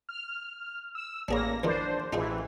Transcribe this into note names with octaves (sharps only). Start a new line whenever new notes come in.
F6
E6
A1 A#3 D4 G#4 C#5 A#6
E2 D#3 E3 D4 C5
A1 E3 D#4 F4 G#4